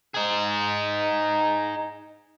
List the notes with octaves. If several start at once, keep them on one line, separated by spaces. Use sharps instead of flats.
D#4 G#4